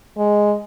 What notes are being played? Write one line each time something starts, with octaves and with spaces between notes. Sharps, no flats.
G#3